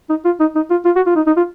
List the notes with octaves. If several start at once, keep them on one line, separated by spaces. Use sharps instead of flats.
D#4
F4
D#4
D#4
F4
F4
F#4
F4
D#4
D#4
F4